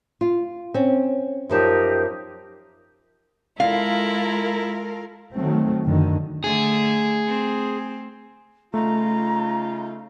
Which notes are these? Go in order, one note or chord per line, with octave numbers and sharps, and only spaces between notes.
F4
C4 C#4
F#2 F3 D#4 G4 A#4 A5
G#3 E4 F4 A4 A#4 F5
D#3 F#3 A3 C4
F#2 D3 D#3
D3 A3 G#4
C4
C#3 A3 D#4 F4 A#5